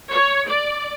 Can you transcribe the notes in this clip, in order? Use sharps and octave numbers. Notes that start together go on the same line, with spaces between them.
C#5
D5